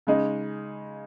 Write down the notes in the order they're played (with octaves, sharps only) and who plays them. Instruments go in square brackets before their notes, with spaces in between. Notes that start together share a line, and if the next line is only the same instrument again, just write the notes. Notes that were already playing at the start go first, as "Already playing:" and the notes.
[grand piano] C#3 G#3 D#4